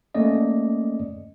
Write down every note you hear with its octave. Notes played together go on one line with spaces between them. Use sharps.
A3 A#3 C#4 D5 D#5